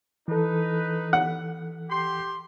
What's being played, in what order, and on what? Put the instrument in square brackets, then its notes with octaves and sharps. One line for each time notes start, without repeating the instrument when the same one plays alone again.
[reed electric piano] E3 A4 [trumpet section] D#4 B4
[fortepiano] F#5
[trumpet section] G4 C6